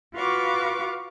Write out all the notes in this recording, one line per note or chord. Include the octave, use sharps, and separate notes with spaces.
F4 F#4 B4 F5 C#6 D6